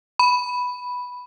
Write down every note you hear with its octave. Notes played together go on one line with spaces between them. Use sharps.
B5